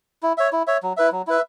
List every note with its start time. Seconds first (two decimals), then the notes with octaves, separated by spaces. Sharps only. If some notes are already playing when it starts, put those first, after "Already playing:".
0.23 E4
0.38 C#5 E5
0.53 E4
0.67 C#5 E5
0.83 F#3
0.97 E4 B4 E5
1.12 F#3
1.27 E4 B4 E5